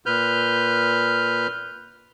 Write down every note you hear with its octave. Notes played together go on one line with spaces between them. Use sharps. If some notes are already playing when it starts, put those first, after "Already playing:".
A#2 B4 F6 G6